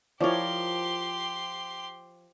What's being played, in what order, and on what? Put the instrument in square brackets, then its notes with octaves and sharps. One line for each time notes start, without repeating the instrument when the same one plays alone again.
[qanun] F3 A#4 [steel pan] E4 C#5 D5 [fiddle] G4 C6